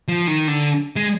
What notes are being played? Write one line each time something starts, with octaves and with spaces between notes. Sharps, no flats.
F3
D#3
D3
G#3